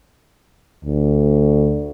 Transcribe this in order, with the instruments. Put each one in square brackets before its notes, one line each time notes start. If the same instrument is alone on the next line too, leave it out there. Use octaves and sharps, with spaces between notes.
[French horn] D2